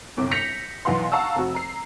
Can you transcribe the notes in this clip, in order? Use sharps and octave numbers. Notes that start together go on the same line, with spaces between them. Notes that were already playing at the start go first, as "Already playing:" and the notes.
G1 C2 D6
G6 A#6 B6 C#7 F7
B1 E3 B3 F5 F#5 C6
F5 F#5 A5 A#5 C#6 E6
F1 F#4
A#5 C7